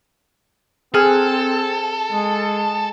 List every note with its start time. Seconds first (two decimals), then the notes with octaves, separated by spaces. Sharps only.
0.94 C4 G#4 A4 F6 F#6
2.12 G#3